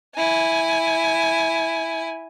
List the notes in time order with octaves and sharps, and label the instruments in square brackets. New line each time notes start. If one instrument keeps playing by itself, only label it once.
[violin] E4 G#5